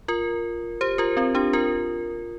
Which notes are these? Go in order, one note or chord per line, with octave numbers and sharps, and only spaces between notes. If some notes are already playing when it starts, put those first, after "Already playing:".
F4 A#4
G4 C5
F4 A#4
C4 F4
D4 G4
F4 A#4